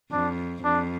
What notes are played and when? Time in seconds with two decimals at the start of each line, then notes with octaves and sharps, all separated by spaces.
0.12 F2 D4
0.64 F2 D4